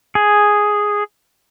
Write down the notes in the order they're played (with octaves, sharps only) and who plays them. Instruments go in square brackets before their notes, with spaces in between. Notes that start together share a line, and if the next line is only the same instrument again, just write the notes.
[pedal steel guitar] G#4